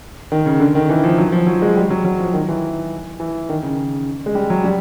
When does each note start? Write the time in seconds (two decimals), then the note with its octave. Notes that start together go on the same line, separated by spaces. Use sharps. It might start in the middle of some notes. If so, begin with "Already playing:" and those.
0.32 D#3
0.46 C#3
0.60 D3
0.75 D#3
0.90 E3
1.04 F3
1.18 F#3
1.32 F3
1.47 F#3
1.62 G#3
1.76 G3
1.90 F#3
2.05 F#3
2.19 F3
2.34 D#3
2.48 E3
3.20 E3
3.49 D#3
3.63 C#3
4.26 G#3
4.35 G3
4.50 F#3
4.64 G3